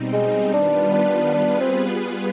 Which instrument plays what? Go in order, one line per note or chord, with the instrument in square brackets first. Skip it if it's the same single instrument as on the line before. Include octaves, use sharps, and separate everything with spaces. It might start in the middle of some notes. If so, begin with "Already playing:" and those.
Already playing: [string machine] B2 G3 C4 D#4
[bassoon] G#3
[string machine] D#3 G3 B3 F4 B4 [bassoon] D4
[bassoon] D4
[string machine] G3 B3 F4 G#4 B4 [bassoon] D4
[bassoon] C4